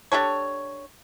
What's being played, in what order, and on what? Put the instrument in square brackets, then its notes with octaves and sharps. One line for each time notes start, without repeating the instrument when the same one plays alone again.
[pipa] D4 G4 A4 C#5